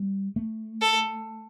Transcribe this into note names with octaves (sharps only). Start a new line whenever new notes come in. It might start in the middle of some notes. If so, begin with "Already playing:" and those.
Already playing: G3
A3
A4